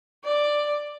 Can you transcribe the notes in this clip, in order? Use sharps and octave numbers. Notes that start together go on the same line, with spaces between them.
D5